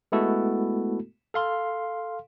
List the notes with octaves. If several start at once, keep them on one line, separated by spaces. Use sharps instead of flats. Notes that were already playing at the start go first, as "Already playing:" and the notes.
G#3 A3 B3 E4 F#4 A4
A4 F5 C6